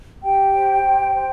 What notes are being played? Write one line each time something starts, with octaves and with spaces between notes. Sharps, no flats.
G4 G5
C5
G4
C5